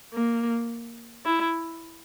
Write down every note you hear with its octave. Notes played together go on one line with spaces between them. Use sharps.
A#3
E4